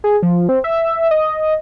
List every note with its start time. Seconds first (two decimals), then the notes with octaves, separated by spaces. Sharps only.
0.04 G#4
0.23 F3
0.49 C4
0.64 E5
1.11 D#5